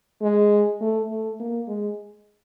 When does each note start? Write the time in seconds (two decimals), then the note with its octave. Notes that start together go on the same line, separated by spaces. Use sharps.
0.22 G#3
0.81 A3
1.10 A3
1.40 A#3
1.68 G#3